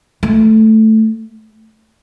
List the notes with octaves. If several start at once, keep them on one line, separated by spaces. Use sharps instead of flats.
A3